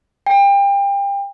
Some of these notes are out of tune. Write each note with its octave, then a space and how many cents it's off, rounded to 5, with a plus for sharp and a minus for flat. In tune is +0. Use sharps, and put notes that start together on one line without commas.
G5 +30